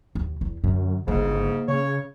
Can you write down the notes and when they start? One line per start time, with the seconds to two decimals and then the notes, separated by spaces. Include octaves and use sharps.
0.15 D#2
0.41 E2
0.64 F#2 D3
1.08 G1 G#2 C#3 A#3
1.68 C#3 C#5